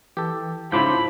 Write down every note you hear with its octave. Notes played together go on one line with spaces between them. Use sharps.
E3 G4 A4
G#2 C#3 F3 E4 B5 C6 D6 G6